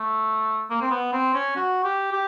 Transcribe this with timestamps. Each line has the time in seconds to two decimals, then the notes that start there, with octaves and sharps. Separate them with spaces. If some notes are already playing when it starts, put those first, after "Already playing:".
Already playing: A3
0.70 A#3
0.81 C4
0.91 B3
1.13 C4
1.34 C#4
1.56 F#4
1.84 G4
2.12 G4